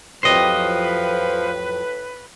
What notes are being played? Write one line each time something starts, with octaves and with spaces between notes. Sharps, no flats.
F2 A2 F3 F#3 G4 B4 C5 D#5